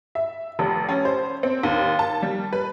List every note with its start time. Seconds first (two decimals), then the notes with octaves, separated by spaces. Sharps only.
0.15 E5
0.59 F1
0.89 C#4
1.05 C5
1.43 C4
1.63 D#2
1.99 A5
2.22 G3
2.53 B4